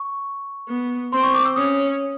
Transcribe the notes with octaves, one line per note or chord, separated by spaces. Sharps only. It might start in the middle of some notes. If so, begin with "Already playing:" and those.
Already playing: C#6
B3
C4 C6
C#6
D6
E6
C#4 D#6